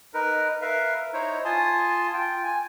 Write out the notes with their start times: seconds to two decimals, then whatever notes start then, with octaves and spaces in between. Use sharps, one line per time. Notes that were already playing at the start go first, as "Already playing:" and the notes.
0.14 D#4 A#4 B4
0.62 A#4 B4 E5 F5
1.13 D#4 E4 C5 C#5
1.45 F4 G#5 A5 C6 D#6
2.14 F4 G5
2.44 G#5